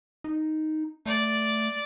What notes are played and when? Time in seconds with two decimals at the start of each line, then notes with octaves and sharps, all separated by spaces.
0.24 D#4
1.06 A3 D5